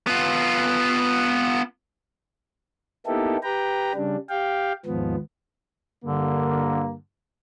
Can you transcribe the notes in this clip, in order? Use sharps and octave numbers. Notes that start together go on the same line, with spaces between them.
B3 F4
A#3 B3 D#4 E4 G4 A4
G4 B4 G5 A#5
C#3 G3 D4
G4 F5 G5
D#2 G#2 F3 B3
G2 D3 A#3